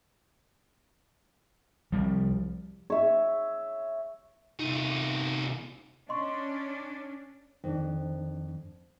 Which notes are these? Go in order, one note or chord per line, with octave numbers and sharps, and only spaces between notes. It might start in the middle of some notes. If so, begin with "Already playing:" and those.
C2 F3 G3
C#5 E5
C2 D#4
C#4 D4 D#5 C6 C#6
F2 D#3 D4